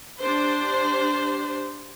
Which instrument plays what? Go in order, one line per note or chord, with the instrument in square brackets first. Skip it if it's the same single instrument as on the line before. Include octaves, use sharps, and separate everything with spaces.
[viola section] D4 G4 C5